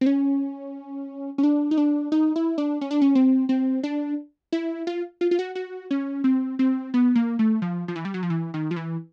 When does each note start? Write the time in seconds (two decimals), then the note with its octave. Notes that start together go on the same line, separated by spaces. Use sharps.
0.01 C4
0.06 C#4
1.38 C#4
1.43 D4
1.71 D#4
1.78 D4
2.12 D#4
2.36 E4
2.58 D4
2.81 C#4
2.91 D4
3.02 C#4
3.15 C4
3.49 C4
3.83 D4
4.52 E4
4.87 F4
5.21 F4
5.31 F4
5.39 F#4
5.55 F#4
5.91 C#4
6.24 C4
6.59 C4
6.94 B3
7.15 A#3
7.39 A3
7.62 F3
7.88 F3
7.96 E3
8.05 G3
8.14 F#3
8.23 F3
8.30 E3
8.54 D#3
8.71 F3
8.76 E3